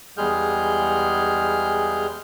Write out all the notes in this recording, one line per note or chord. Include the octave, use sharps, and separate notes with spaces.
E2 G3 G#3 G#4 F6 G6